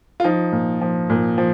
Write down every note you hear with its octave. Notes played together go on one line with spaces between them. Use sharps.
F4
F3 D#4
A#2
F3
A#2
F3